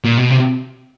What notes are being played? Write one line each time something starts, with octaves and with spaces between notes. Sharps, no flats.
A#2
B2
C3